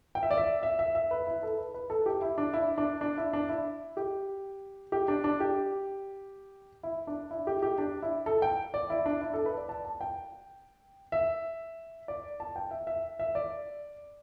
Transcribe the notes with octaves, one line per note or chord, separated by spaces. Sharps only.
G5
E5
D5
E5
E5
E5
E5
B4
E4
A4
B4
B4
A4
G4
E4
D4
E4
D4
D4
E4
D4
E4
G4
G4
D4
D4
G4
E4
D4
E4
G4
G4
D4
E4
A4
G5
D5
E4
D4
E4
A4
B4
D5
A5
A5
G5
E5
D5
A5
G5
E5
E5
E5
D5